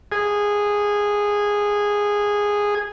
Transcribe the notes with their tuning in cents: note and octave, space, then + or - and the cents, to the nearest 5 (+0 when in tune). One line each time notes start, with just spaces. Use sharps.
G#4 -10